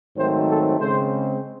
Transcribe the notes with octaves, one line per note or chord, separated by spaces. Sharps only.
G#2 D#3 F#3 A3 C4 C5
A4
C#3 G#3 C4 C5